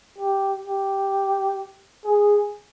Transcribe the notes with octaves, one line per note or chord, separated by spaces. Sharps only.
G4
G4
G#4